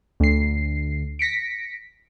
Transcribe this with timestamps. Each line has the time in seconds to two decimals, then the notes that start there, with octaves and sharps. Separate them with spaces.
0.20 D2 C7
1.19 A#6 B6 C#7 D7